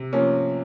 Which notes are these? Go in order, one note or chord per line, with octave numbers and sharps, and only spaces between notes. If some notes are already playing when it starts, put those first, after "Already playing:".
Already playing: C3
F3 A#3 C#4